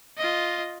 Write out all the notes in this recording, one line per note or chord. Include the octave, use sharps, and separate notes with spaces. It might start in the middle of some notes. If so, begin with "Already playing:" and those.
F4 D#5